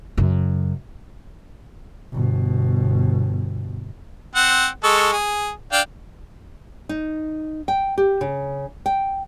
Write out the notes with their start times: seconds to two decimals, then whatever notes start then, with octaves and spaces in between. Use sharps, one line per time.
0.17 F#2 C#3
2.12 G1 B2
4.35 C4 F#5
4.84 G#3 A4 C#6
5.12 G#4
5.72 D4 F5 G5
6.89 D#4
7.68 G5
7.98 G4
8.21 C#3
8.86 G5